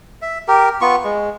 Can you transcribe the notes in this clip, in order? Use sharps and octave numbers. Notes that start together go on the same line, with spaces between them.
E5
G4 A#4
B3 F4 C#6
G#3